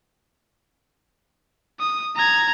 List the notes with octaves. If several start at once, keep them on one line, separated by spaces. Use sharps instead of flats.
D#6
A#5 G#6